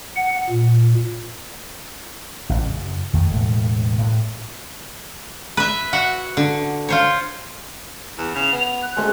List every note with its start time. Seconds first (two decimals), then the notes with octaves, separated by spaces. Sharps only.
0.16 F#5
0.50 A#2
2.49 A1
2.65 F#2 C#3
3.13 F2 D#3 A3
3.31 E1 A2
3.99 A2
5.57 B4 E5
5.93 F#4 E5 F#5
6.37 D3
6.89 F4 C5 C#5
8.18 E2
8.35 C#3 F7
8.52 B3
8.82 F#6
8.96 F#2 G#3 A3 C4